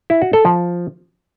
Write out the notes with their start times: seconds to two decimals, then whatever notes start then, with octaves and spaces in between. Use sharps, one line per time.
0.10 E4
0.22 F#4
0.33 A4
0.45 F3